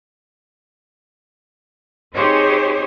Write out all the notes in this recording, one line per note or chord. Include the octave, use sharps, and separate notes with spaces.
C4 D#4 G4 G#4 C5 C#5